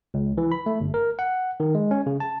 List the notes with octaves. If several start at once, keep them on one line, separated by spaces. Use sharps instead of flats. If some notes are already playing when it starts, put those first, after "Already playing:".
C#2
E3
B5
A3
G1
A#4
F#5
D#3
G#3
C#4
C#3
A5